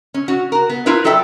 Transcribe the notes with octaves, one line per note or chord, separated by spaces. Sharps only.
C#4
C#4 F#4
F#4 A#4
B3
E4 F4 A#4 B4
F#3 A4 D5 E5 G5